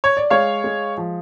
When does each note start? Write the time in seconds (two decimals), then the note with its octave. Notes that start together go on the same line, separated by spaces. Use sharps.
0.04 C#5
0.17 D5
0.30 G#3 C#5 F5
0.64 G#3
0.98 F3